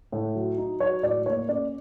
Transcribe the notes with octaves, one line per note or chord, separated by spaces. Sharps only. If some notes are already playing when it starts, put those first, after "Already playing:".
A2
F#3
D#4
F#3 C#5
A2 D5
A#3 C#5
C#4 D5